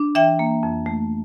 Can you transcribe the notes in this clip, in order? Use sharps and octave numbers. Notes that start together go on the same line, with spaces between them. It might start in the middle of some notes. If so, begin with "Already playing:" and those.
Already playing: D4
E3 E5 G5
A#3
F2
A3